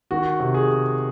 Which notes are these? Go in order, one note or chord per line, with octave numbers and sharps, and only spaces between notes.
D#3 F#4
C3
G#4